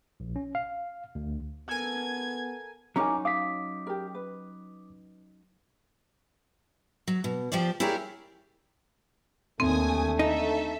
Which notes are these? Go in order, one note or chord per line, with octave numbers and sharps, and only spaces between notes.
A#1
C#4
F5
D2
B3 A4 A#4 G#5 G#6
F#3 C#4 D#4 E4 A#4 G#5 A#5 D6
F5 D6 D#6 B6
G4 A#4
B4
F#3
B2
F3 G4 C5 D5
E4 G4 G#4 A#4 C#5 D5
D#2 D3 A3 C4 G#5 D#6
D#4 A4 E5